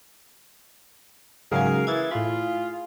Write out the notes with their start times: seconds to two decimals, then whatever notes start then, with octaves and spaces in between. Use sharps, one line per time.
1.52 G#2 C#3 F#3 G#4 A#4 F5 G#5
1.87 E3 G#6 A6
2.11 A2 F4 B5